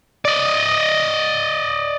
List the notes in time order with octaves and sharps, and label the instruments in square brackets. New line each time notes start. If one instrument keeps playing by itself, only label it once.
[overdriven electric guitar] D5 D#5